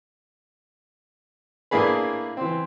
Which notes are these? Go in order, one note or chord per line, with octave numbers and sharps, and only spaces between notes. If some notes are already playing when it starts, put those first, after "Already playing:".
A2 A#3 D4 G#4 B4
E3 C4